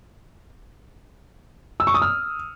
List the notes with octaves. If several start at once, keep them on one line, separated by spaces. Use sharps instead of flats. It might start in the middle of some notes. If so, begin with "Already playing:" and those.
E6
C#6
D#6
F6